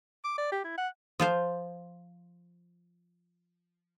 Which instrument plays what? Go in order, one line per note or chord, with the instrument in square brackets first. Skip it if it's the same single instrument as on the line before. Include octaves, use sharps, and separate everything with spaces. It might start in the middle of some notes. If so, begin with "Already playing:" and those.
[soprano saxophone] D6
D5
G4
E4
F#5
[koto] F3 F4 C5